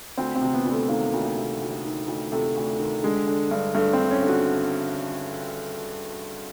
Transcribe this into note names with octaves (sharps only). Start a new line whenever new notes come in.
D2 C4
C4
C3
B3
D2
A3
D#3 A#3
D2
C3
D2
D#3
D2
C3 A3
D2
D#3
D3 G#3
D3
G2
G2 A3
C4
D3
C#4
D3
F#4